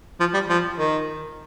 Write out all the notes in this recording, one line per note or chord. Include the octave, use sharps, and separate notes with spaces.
F3
G3
F3
D#3